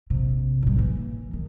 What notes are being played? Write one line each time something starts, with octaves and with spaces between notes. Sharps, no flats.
A#1 C3
A2 G#3
E3 A#3
D#3